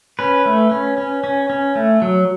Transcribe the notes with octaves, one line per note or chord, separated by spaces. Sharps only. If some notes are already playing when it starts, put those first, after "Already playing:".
C#4 B4
A3
C#4
C#4
C#4
C#4
A3
F#3